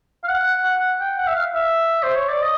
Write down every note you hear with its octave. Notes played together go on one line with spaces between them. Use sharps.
F5
F#5
F#5
G5
F#5
E5
F5
E5
C5
C#5
D5
D#5